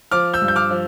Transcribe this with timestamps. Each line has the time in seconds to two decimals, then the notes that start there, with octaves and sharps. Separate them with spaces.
0.11 F3 D6 F6
0.34 E6 G6
0.42 G2
0.48 G6
0.56 D6 F6
0.70 F3